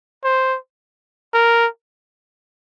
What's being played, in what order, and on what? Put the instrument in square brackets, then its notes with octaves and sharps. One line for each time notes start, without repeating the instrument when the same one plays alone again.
[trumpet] C5
A#4